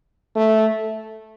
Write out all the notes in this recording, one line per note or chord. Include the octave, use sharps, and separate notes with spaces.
A3